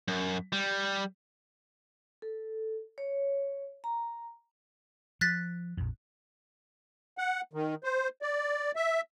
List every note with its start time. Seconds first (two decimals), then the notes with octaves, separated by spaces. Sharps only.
0.08 F#2
0.53 G3
2.22 A4
2.98 C#5
3.84 A#5
5.21 F3 F#6 A6 B6
5.77 A#1 F2
7.18 F#5
7.53 D#3
7.84 C5
8.22 D5
8.76 E5